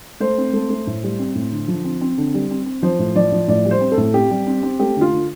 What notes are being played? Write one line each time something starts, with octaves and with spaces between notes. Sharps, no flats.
A3 C5
C4
A3
A3
A2
G3
C4
A2
D3
F3
C4
C4
D3
G3
C4
C4
F3 C5
A2
F3 D5
F3
A2 D5
G3
C5
C4
A4
A2
C4 G4
G3
C4
C4
A3 G4
D3 F4
D3